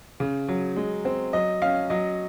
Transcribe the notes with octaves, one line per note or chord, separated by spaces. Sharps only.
C#3
F#3
G#3
C4
F#3 D#5
C#4 F5
F#3 D#5